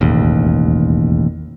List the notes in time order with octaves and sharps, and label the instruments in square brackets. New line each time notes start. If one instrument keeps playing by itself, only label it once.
[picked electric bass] E1 A1 D#2